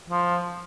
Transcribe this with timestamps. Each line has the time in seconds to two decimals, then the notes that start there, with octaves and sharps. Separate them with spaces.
0.09 F3